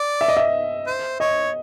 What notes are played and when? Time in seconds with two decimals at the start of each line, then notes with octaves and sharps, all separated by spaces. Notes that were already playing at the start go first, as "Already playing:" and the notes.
Already playing: D5
0.21 E5
0.28 D#5
0.37 E5
0.87 C5
1.20 C#5 D#5